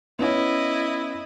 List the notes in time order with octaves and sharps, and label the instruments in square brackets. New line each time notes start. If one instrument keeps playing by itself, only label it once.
[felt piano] B3 C#4 [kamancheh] E4 D#5